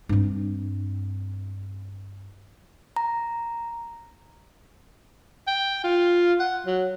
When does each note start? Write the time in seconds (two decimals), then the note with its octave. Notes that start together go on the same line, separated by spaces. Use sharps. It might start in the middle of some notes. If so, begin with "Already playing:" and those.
0.09 G2 C4
2.96 A#5
5.47 G5
5.84 F4
6.40 F#5
6.66 F#3